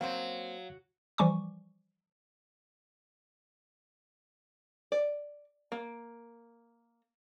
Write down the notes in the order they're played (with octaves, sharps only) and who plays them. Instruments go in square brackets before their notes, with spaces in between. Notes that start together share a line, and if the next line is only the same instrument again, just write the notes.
[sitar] F#3 [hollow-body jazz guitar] A#3 C4 C5 [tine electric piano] F5 F#5
[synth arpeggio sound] E3 F3 G3 G#5 C#6 D6
[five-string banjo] D5
A#3